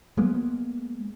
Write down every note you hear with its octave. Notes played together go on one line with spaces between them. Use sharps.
F#3 G#3 A#3 B3